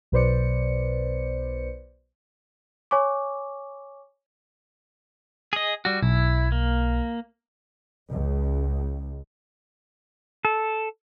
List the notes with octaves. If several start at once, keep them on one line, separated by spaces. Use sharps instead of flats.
B1 B2 B4 C5 D5 C#7
C#5 G#5 C#6 D6
G#4 D#5
G3 F#4
B1 E4
A#3
C#2
A4